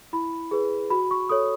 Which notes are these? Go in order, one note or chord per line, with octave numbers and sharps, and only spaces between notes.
E4 B5
G#4 B4
F#4 B5
C#6
A4 C#5 D#6